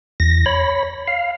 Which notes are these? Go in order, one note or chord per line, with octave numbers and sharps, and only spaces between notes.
E2 A#6
C#5 B5
F5